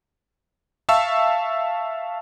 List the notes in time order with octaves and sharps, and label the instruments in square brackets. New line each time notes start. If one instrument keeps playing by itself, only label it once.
[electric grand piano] E5 F5 A5 C#6 E6